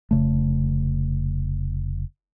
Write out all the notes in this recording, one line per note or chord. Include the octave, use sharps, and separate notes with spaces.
F1 C#3 A3